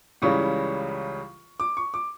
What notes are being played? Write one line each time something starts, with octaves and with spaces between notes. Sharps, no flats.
C#2 C#3 E3 G3 C#4 C#6
D6
C#6
D6